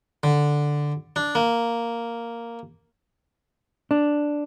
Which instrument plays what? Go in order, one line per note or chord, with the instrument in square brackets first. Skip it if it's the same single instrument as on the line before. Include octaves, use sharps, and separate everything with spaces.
[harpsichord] D3
D4
A#3
[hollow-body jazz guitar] D4